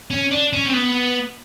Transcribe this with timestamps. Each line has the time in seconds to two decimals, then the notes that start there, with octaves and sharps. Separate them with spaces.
0.10 C#4
0.31 D4
0.53 C#4
0.66 C4
0.73 B3